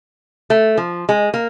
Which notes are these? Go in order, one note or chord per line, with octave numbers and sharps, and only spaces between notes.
A3
F3
G#3
A#3